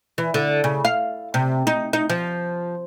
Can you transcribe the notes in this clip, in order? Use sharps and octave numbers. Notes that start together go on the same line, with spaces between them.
E3
D3
C#3
F5
C3
D#4
D#4
F3